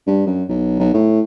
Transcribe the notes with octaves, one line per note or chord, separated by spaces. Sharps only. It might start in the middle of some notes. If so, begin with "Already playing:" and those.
G2
F#2
B1
B1
A2